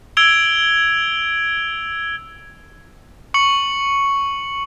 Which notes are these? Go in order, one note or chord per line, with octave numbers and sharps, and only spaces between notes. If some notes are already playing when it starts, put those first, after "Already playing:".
E6 G#6 D7 F7 G7
C#6 C#7 F#7